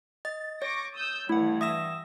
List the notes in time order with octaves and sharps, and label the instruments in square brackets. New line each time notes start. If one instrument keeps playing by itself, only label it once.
[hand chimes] D#5 [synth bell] A6
[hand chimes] C#5 [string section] C#6 D6 A#6
[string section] D#6 E6 G6
[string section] G2 E3 [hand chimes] A3 [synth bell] E4 F#5
[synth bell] E5 A#6 E7 [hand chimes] D#6 E6